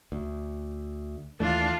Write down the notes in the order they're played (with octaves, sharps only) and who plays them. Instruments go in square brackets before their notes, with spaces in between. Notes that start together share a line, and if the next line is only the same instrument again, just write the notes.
[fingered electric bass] D2
[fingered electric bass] D#2 E3 A3 [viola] D4 F4